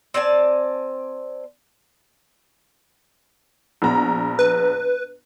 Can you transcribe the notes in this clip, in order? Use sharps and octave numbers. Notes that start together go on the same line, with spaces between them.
C4 D5 G#5 A5
A#1 B3 A#5
B4